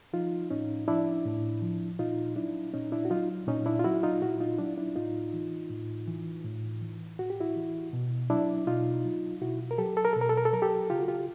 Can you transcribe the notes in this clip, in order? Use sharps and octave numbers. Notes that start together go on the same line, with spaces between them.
F3 D#4 F4
A2 C#4 D#4
F3 D4 E4
A2
F3
A#2 D#4 F4
F#3 D4 E4
A#2 C#4 D#4
D4 E4
F#4
F#3 D#4 F4
A#2 C#4 D#4
D4 E4
F4
F#3 E4 F#4
D#4 F4
A#2 E4 F#4
D#4 F4
F#3 D4 E4
D4 E4
A2 D#4 F4
E3
A2
E3
A2
E3
A2 F#4
G4
E4 F#4
E3
B2
F#3 D4 E4
B2 D#4 F4
F#3
B2 E4 F#4
A#4
F#3 G4 A4
A4
A#4
B2 A4
A#4
A4
A#4
A4
F#3 A#4
G4 A4
C#3 F4 G4
F#4
F4 G4